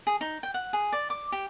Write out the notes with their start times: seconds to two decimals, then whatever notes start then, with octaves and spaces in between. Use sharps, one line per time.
0.07 G#4
0.21 D#4
0.43 G5
0.54 F#5
0.73 G#4
0.93 D5
1.10 D6
1.32 G4